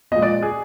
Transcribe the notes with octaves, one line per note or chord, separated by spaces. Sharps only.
A#2 F3 G#3 D#5
D5
G#4